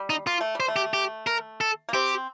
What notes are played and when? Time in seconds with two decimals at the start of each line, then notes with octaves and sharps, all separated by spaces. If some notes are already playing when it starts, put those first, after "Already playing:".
Already playing: G3
0.10 D#4
0.26 A#3 F4
0.41 A3
0.55 G3
0.60 C5
0.68 A3
0.76 G4
0.94 G4
1.27 A#4
1.61 A4
1.89 A#3
1.94 C4 G4